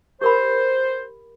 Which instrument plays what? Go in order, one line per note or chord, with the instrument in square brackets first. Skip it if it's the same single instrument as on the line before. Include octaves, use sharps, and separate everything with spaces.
[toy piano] G4 A#4 B5 [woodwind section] C5